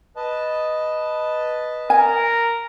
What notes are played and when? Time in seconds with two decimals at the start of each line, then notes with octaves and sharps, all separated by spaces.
0.16 B4 D#5 A5
1.90 A#4 G#5